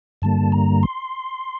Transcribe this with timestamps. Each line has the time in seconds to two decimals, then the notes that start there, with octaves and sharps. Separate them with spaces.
0.22 G2 D3 G3 A#3 A5
0.52 A#5
0.83 C6